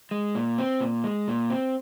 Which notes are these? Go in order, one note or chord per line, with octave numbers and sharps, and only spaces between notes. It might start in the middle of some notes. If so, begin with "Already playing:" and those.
G#3
A#2
C4
A#2
G#3
A#2
C4